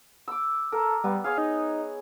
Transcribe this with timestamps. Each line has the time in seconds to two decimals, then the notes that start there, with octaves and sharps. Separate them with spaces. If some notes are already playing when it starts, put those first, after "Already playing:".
0.28 D6 E6
0.72 A4 A#4
1.04 G3 B3
1.24 G#4 C#5 F5
1.38 D#4